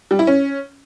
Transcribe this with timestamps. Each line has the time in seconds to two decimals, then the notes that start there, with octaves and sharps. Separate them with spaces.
0.11 G3
0.19 E4
0.27 C#4